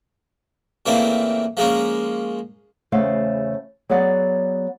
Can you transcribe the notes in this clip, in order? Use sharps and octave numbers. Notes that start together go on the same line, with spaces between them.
A#2 C#3 E3 A3 A#3 C4
F3 G#3 A#3 C#4
E2 C#3 A3 C5 F5 F#5
F#3 B3 G#4 D5 F#5